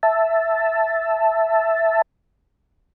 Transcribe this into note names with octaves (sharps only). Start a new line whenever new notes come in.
E5 A5